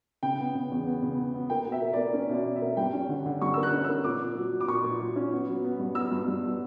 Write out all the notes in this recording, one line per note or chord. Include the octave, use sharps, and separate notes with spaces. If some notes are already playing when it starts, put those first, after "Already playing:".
C#3 G5
B3
C#3
E2
B3
C#3
B3
B3
A#3 G5
B2
E5
A#3
D5
A#3
C#4
B2
D5
B2
E5
A#3
G2 G5
C#4
D3
D3
G2 C#6
A#3 E6
F#6
C#4
E6
A#3
A#2 D6
A#2
F#3
F#3
D6
A#2 C#6
A#2
F#3
C#4
B3
F#3
B3
G2
B3 E6
G2
G2
B3